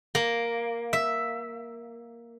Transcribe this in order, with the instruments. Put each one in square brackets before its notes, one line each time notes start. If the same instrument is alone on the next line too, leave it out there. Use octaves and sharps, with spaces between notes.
[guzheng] A#3
E5